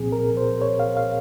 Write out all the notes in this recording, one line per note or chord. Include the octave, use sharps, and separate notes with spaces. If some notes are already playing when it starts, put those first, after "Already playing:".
Already playing: C2 A#2 F3 C4 G#4
A#4
C5
C#5
F5
F5